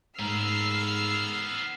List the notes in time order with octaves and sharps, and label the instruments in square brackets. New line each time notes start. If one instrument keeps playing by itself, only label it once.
[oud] G#2 [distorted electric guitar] B3 A#4 [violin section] E6 F6 C7